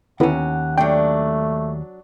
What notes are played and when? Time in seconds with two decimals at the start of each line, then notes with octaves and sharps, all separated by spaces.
0.20 D#2 D3 B3 C#4 E4 F#5
0.78 F#3 A3 D4 G5